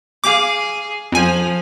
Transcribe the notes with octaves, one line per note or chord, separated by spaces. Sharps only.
G#4 F5 D6
F2 F3 G#5